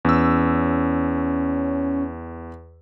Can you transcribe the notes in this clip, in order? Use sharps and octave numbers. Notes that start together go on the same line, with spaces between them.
E2 C#4 E6